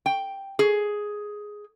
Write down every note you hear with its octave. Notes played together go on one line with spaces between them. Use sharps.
G5
G#4